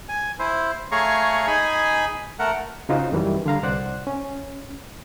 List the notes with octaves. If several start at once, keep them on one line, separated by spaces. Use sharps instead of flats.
G#5
E4 C5
A3 G#4 C#5 F5 A#5 C#6
D#4 G#4 G#5 B5
A3 A#4 F#5
C#3 D#4 F4 F#4 C5
F#2 D#3 E3 F#3 G3
D3 G3 F5 A#5
C2 C5 D5 F#5 F#6
C#4